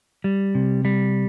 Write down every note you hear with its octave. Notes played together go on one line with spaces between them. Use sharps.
G3
C3
G3